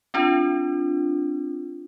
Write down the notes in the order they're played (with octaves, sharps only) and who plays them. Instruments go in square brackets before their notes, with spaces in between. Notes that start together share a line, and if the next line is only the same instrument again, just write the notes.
[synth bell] C4 D4 F4